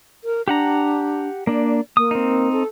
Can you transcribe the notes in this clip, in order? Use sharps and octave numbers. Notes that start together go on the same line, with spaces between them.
A#4
D4 G4 F#5 A#5
A#3 D4 D5
A#3 D#6
C4 D#4
A4